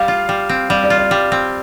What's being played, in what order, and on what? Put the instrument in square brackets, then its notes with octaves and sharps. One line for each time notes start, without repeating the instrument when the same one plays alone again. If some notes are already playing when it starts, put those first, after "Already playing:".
Already playing: [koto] G3 [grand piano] F5
[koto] F4
G3
C4
[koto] G3 [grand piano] F5
[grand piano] D5
[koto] F4
[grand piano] D5
[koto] G3
C4